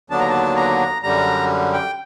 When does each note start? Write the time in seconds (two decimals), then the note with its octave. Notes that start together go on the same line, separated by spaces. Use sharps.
0.10 D#2 D3 F#3 B3 D4 A5
0.20 A#5
0.29 A5
0.56 A#5
1.03 F#2 D3 G3 A#5
1.73 G5